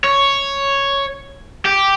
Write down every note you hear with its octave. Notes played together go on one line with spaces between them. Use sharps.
C#5
G4